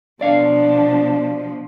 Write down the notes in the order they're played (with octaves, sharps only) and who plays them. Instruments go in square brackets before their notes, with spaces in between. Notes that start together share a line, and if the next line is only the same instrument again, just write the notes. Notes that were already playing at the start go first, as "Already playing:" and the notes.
[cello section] B2 F3 [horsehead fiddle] D4 [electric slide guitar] D5 F5